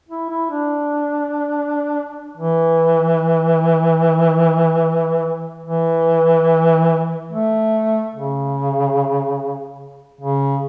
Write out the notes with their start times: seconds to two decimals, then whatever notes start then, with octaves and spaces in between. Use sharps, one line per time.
0.09 E4
0.30 E4
0.50 D4
2.37 E3
5.66 E3
7.32 A3
8.15 C#3
10.21 C#3